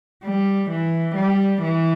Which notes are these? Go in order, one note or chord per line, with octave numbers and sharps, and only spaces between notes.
G3
E3
G3
E3